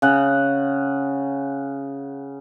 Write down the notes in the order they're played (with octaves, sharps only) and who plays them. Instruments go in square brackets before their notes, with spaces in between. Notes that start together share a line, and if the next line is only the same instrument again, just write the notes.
[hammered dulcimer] C#3 F#5